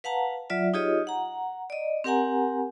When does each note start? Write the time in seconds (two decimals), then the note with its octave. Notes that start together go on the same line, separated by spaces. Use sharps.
0.04 B4 F5 F#5 A5 A#5
0.50 F#3 F4 D5 E5
0.74 D#4 F4 G4 G#4 C#5 D#5
1.07 F#5 A#5
1.70 D5 D#5
2.04 C4 G4 A#4 F#5 G#5 A#5